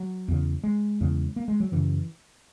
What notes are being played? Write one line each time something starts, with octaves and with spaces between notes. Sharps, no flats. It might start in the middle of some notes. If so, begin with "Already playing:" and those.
Already playing: F#3
E2 C#3
G#3
E2 C#3
A#3
G#3
F#3
F#2 C#3 E3